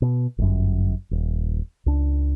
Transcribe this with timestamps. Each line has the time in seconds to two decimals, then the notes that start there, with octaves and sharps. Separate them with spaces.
0.02 B2
0.38 G1 F#2
1.11 D#1
1.86 C#2 D4